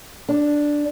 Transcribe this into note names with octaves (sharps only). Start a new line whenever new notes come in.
D4